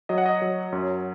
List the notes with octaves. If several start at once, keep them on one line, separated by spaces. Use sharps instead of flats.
F#3 D#5
F#5
D#5
F#3
F#2